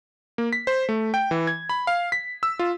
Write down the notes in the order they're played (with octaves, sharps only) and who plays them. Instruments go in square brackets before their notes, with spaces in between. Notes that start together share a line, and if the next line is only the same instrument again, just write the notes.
[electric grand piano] A#3
B6
C5
A3
G5
E3
G#6
B5
F5
B6
E6
F4